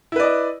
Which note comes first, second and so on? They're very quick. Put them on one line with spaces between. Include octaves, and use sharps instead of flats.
E4 B4 D5 D#5